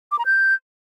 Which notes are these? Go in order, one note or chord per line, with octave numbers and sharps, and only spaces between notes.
D6
A#5
G6